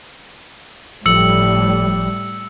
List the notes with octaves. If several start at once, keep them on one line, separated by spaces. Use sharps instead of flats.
G1 A2 F3 G3 A4 E6 C#7 F#7